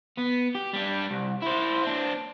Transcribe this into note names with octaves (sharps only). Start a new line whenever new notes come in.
B3
G4
G3 D4
C2
E4 C5
C4 D4